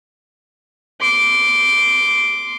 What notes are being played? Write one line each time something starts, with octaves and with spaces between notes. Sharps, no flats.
C6 D6